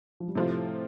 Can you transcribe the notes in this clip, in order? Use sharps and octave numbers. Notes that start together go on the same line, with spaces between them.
F3
G3
A2 C3 F3 A3 C4 F4